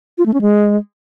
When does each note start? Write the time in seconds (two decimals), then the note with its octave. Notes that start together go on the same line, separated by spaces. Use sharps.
0.18 F4
0.26 A3
0.34 C#4
0.41 G#3